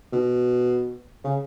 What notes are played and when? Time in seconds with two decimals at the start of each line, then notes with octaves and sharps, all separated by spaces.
0.13 B2
1.24 C#3